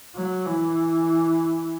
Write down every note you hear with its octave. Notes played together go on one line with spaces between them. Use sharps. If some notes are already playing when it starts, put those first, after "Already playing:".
F#3
E3